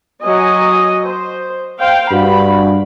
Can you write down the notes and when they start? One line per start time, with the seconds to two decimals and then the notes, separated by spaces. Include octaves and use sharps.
0.22 F#3 D#5 G#5
1.07 C5
1.80 C5 F5 G5
2.12 G2 F#4 B5